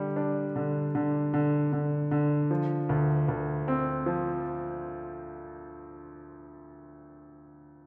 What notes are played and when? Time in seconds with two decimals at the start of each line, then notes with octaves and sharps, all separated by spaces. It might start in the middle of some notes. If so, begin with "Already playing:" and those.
Already playing: D3 G3
0.16 D4
0.56 D3
0.95 D3
1.34 D3
1.73 D3
2.11 D3
2.51 F3
2.89 D2
3.28 D2
3.68 C4
4.06 F3